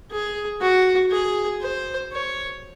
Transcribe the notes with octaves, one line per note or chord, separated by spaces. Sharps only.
G#4
F#4
G#4
C5
C#5